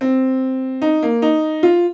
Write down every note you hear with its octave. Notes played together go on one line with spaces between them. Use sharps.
C4
D#4
A#3
D#4
F4